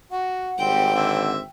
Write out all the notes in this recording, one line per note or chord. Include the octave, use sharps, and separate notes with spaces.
F#4 F#5
G#1 G3 C4 G5
D3 C4 E5